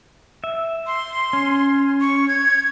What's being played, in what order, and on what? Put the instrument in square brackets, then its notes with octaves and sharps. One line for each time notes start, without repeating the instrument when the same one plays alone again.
[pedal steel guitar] E5
[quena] C6
[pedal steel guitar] C#4
[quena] C#6
G#6